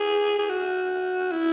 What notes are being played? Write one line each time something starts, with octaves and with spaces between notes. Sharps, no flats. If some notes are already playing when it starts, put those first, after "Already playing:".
Already playing: G#4
G#4
F#4
E4